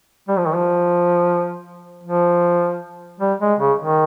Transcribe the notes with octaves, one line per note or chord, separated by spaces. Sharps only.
G3
F3
D#3
F3
F3
G3
G#3
C#3
D#3